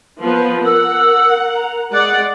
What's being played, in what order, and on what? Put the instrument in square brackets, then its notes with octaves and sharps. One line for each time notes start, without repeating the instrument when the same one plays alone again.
[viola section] F3 B3 B4
[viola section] A#4 F#5 [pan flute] E6
[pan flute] A#5
[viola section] G#3 D5 F#5 [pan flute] F#6